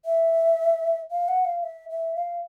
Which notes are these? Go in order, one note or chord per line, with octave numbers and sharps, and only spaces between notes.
E5
F5
F#5
F5
E5
E5
F5